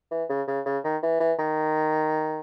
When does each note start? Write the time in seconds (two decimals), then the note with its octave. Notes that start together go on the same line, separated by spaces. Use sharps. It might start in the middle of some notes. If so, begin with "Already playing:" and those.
0.11 E3
0.30 C#3
0.48 C#3
0.66 C#3
0.84 D#3
1.03 E3
1.20 E3
1.39 D#3